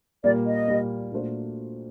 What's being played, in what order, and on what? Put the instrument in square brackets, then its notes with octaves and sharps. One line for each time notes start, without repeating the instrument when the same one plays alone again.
[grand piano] A#2 G3 A#3 [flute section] D5
[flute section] D#5
[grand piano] A#2 G3 A#3
A#2 A3 D4 F#4 C5